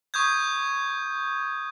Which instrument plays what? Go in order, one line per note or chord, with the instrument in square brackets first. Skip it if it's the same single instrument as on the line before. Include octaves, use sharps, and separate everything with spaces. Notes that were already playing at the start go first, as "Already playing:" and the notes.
[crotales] C#6 D#6 G6 G#6